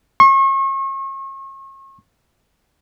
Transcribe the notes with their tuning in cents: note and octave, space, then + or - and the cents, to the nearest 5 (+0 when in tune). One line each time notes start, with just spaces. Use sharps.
C#6 -40